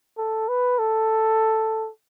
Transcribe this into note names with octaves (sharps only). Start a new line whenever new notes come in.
A4
B4
A4